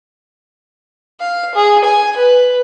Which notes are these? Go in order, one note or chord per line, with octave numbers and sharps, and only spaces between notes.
F5
G#4
G#5
B4